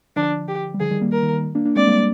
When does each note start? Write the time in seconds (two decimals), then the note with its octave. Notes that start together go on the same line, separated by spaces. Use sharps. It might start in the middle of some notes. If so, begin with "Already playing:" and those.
0.16 D3 F3 D4
0.48 G4
0.74 G3
0.80 D3 F3 G#4
0.91 D#3 G3
1.01 G3 A#3
1.12 D#3 A#4
1.23 D#3
1.33 D#3
1.55 A#3 D4
1.65 A#3 D4
1.76 G#3 C4 D5
1.87 G3 A#3
1.97 G3 A#3